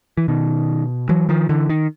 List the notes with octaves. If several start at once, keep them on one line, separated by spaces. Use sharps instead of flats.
E3
B2 D#3
E3 F#3
D#3 F3
D3 E3
D#3